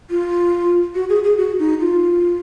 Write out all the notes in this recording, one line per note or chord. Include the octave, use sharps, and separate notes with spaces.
F4
F#4
G#4
G#4
F#4
D#4
F4